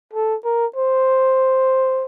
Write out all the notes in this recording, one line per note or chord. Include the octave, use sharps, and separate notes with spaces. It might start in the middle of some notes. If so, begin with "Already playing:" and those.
A4
A#4
C5